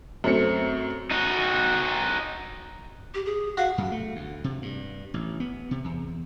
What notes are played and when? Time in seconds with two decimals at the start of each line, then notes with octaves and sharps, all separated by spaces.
0.24 F#2 A3 C4 C#7
1.11 D#4 F#4
3.14 G4
3.26 G#4
3.57 F#4 F5
3.78 F#2
3.92 A3
4.16 D2
4.44 C3
4.62 G2
5.14 A1
5.40 B3
5.71 C3
5.84 E2